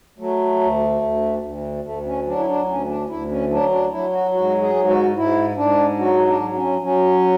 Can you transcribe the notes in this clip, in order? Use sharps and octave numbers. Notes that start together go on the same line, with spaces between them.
F#3 A3
D2
D2
D2
D2 A3
C#4
F#3 D4
E4
D4
D2 C#4
D4
D2 E4
C#4
F#3 D4
D4
F#3 E4
F#4
G#2 F#4
G#4
G#2
F#4
G#2 E4
G#2 D4
F#3 F#4
D4
F#3
C#4
F#3 C#4